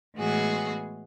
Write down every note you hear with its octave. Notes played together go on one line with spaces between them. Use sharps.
A2 E3 G#3 B3 F#4 G#4